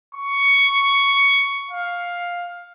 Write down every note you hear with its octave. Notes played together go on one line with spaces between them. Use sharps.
C#6
F5